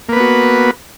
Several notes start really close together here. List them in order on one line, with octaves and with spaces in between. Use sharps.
A#3 B4 B3 F#4